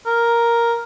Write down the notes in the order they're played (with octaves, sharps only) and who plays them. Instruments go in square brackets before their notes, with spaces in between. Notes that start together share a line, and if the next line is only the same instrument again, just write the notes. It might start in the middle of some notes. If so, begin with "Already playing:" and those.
[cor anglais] A#4